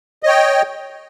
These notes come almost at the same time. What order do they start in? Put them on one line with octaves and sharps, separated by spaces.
D#5 C#5 G5